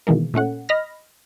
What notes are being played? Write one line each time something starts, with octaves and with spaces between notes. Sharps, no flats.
B2 D#3 E3 G#3 A#3
A#2 A3 C#4 F#5
D#5 B5 F6 A#6